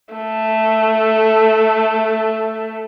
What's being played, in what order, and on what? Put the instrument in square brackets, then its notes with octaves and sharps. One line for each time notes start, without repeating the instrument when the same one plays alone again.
[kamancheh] A3 A4